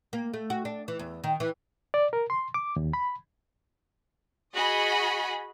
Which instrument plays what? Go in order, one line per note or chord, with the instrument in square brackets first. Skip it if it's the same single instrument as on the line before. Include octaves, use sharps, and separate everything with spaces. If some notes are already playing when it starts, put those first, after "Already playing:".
[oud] A#3
A3
F#4
D4
E3
E2
D#3
E3
[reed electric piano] D5
A#4
C6
D6
D#2
B5
[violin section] F#4 G#4 D#5 B5